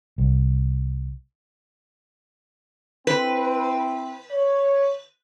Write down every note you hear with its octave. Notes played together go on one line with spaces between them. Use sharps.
C2
C4 E4 B4
C#5